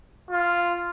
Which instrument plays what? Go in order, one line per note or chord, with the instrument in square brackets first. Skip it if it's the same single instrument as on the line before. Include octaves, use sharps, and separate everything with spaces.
[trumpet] F4